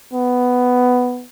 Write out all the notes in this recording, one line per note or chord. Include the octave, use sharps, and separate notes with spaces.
B3